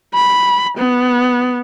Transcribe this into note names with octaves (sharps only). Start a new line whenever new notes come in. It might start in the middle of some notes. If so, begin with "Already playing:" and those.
B5
B3